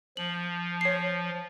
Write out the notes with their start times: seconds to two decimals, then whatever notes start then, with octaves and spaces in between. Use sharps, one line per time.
0.17 F3 F#7
0.81 C#5 C7